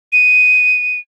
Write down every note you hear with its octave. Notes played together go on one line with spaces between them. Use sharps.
D#7